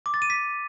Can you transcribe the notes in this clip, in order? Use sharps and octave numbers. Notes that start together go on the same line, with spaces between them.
D6
A6
D#7
B6